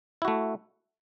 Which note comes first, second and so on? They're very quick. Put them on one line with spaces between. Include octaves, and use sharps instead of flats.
E4 F#4 A3